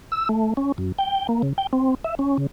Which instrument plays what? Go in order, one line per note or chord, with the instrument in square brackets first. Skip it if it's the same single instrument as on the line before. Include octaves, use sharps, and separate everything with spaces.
[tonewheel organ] E6
A3
C#4
F#2
G5
A#3
C#3
G5
C4
E5
C#4
C#3